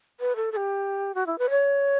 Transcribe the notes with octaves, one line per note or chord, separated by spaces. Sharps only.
B4
A4
A4
G4
F#4
E4
B4
C#5